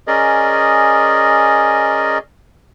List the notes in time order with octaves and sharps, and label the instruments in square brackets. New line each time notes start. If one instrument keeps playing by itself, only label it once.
[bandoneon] C#4 G#4 A#4 D5 D#5